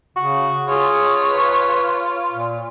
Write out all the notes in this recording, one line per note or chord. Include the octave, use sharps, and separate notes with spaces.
C#3 F#4
F4 G#4 C#5
B4
A#2